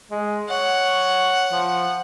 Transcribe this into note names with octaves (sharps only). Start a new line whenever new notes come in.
G#3
C#5 F#5
F3